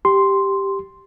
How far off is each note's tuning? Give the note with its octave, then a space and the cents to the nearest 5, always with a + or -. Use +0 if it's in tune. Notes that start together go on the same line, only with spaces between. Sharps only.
G4 +0 C6 +0